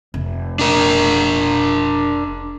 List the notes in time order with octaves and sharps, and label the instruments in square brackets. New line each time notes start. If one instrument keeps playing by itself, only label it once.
[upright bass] F1
[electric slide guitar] D4 A#4